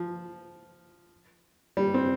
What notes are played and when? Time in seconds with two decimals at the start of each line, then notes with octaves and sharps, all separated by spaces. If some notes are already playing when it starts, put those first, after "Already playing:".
Already playing: F3
1.77 G3
1.94 C4